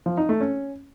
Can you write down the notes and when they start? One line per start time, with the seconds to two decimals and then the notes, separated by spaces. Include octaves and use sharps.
0.06 F3
0.17 D#4
0.29 A3
0.41 C#4